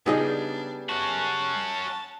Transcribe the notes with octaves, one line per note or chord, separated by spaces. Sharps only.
C#3 G3 B3 D4 D#4 G#4 D#5
C#4 F#4 A5